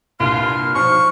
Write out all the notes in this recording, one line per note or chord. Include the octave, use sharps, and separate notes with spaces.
C2 G2 A#2 F4 F6
B1 F3 C#6